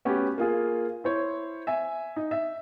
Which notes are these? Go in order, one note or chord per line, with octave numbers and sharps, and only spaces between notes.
A3 B3 C#4 F#4 G4
A#3 F4 G#4
E4 C5 C#5
E5 G#5
D#4
E5